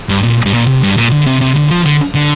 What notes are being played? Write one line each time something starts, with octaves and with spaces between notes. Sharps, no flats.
G2
A#2
G2
A#2
C3
G2
A#2
D3
C3
C3
D3
F3
D3
D3